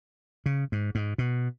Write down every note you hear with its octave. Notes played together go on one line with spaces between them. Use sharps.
C#3
G#2
G#2
B2